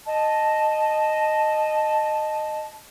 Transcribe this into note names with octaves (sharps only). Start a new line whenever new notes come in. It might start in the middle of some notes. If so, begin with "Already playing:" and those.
D#5 A5